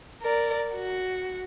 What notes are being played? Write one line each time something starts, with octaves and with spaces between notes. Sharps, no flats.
A#4 D5
F#4